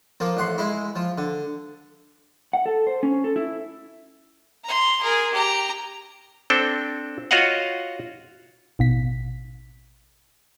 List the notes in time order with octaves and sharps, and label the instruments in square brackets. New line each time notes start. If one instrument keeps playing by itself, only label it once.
[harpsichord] F3 A#3
A1 F#5 C6
G#3 E4
F3
D3
[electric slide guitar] F#5
A4
C5
C#4
A4
E4
[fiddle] A#5 C6
G#4 A#4
G4 A#5
[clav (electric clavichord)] C4 D4 A4 G5
F4 F#4 C#5 D#5 F5 F#5
[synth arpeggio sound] A1 B2 B6